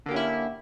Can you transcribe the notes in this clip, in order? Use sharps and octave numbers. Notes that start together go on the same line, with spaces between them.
D3 A#3 C#4 E4 G4